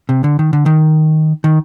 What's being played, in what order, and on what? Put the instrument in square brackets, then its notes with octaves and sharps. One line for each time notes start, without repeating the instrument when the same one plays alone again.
[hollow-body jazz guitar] C3
D3
D#3
D3
D#3
D#3